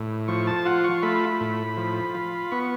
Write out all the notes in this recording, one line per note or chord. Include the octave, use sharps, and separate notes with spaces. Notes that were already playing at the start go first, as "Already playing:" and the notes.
Already playing: A2
F3 C#6
A5
F4 F#5
C#6
A3 B5
A2
F3
F4
B3 C#6